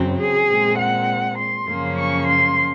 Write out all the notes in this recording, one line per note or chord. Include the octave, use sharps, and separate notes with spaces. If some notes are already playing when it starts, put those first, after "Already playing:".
Already playing: F#2 C#3 F#3 C4
G#4
A#2 G#3 C4
F#5
C6
F#2 C#3 F3 A#3 C#4
C#6
C6